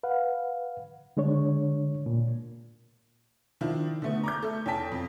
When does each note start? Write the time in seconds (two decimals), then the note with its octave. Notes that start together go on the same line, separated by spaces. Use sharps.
0.03 B4 F5 F#5
1.17 D3 G#3 D4 C#5
2.06 A#2
3.61 D#3 F3 D4 E4
4.02 D3 A3 B3
4.23 A#5 D6 G6
4.42 A3 A4
4.66 E2 C#4 G5 A5 B6
4.92 F2